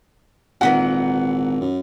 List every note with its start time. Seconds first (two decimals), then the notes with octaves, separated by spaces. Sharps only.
0.61 G#1 A#2 D#3 E3 F#5
1.61 F#2